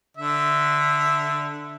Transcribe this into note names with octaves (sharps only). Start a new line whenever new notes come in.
D3 E5